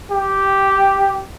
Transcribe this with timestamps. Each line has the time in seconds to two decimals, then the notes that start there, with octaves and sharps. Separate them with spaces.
0.11 G4